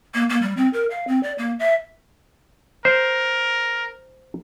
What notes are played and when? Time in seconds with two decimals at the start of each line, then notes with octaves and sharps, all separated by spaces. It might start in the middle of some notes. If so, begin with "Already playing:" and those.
0.15 A#3
0.30 A#3
0.42 G3
0.57 C4
0.73 A#4
0.90 F5
1.08 C4
1.23 D5
1.38 A#3
1.59 E5
2.85 A#4 C5